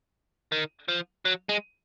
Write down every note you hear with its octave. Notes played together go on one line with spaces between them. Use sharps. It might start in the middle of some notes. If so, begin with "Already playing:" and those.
D#3
F3
F#3
G#3